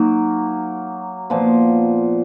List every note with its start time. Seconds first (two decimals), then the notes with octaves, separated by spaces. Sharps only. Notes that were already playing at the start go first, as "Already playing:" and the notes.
Already playing: F#3 A#3 D#4
1.30 A#2 F3 B3